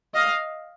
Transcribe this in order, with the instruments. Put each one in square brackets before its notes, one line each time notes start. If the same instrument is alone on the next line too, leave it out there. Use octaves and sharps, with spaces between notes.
[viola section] D#5 F5